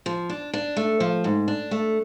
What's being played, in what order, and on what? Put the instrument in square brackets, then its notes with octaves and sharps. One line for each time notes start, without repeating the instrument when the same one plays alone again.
[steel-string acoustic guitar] F3
D4
D4
A3
F3
G#2
D4
A3